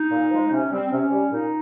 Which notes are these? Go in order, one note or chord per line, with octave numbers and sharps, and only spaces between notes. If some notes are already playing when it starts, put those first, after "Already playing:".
Already playing: D#4
A#2
F3 G#3
C3 C#4
G3 C4
C3 C#4
G3
A#2 D#4